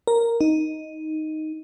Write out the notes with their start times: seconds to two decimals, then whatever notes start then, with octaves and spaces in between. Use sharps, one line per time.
0.07 A#4
0.41 D#4